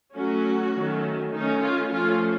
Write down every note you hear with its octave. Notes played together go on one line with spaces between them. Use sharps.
F#3 A3 C#4 F#4
D#3 F#3 A3 C#4
D#3 A3 C#4 D#4
F4
F3 A3 C#4 F4